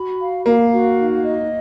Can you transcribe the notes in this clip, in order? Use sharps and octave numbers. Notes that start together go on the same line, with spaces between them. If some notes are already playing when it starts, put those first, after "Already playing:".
Already playing: F#4 B5
F5
A#3 F5
F#4
D#4
D#5